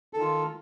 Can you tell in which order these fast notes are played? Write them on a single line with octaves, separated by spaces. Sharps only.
A4 D#3 F4